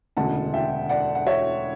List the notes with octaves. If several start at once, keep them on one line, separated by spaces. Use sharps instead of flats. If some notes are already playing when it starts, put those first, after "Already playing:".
E1 D2 C#3 F#5 A5
E5 G5
D5 F#5
F#5
C#5 E5